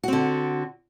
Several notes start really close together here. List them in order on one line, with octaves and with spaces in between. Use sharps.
F#4 C4 D3